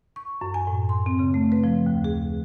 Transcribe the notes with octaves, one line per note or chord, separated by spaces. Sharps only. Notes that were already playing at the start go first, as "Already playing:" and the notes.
C#6
F#2
G#5
A2
C6
C4
C#3
A3
B4
F3
D#2
G#4